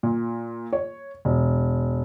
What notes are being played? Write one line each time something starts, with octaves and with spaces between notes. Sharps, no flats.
A#2
C#5
E1